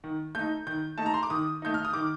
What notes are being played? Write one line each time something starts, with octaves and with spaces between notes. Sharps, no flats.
D#3
A3 D#4 G6
D#3 G6
A3 D#4 A5
A#5
C6
D6
D#3 D#6
A3 D#4 G6
F6
D#6
D#3 D6